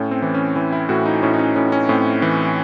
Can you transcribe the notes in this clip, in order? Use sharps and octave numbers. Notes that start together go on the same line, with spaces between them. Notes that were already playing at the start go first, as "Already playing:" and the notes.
Already playing: A2 C#4
C4
E3
C#4
E3
E4
A2 F#4
D#4
A2 C#4
D#4
C#4
A2 C#4
C#4
A2 C4
E3